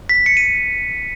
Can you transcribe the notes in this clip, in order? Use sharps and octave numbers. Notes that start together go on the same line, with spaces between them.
B6
C#7
D#7